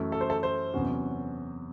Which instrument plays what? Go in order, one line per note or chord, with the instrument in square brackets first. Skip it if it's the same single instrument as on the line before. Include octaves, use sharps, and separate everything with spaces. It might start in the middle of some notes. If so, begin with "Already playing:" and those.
Already playing: [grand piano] F#2 E3 A3
[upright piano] A4
C5
A4
C5
[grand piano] E2 C3 F#3 C#4 F#4